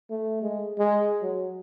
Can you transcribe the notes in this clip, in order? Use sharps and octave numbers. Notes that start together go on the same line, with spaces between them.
A3
G#3
G#3
F#3